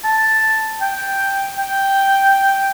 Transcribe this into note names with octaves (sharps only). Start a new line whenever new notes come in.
A5
G5
G5